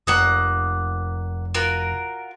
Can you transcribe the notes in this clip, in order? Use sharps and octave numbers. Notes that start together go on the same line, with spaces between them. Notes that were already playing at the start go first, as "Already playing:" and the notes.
F1 A#3 F#5 D#6
F4 F#4 A#4